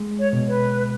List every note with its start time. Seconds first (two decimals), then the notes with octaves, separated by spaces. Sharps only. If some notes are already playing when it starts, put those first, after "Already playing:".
Already playing: G#3
0.19 C#5
0.33 B2
0.48 B4